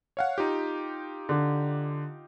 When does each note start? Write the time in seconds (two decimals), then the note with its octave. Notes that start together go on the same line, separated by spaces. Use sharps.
0.17 C#5 F5 F#5
0.38 D#4 F4 G4
1.29 D3